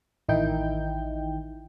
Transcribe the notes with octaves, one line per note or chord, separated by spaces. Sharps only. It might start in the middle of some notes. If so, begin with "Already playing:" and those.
A1 D#3 D#4 E4 G5 G6